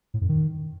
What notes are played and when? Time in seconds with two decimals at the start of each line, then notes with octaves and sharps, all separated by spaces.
0.14 A2
0.21 F#2
0.29 D#3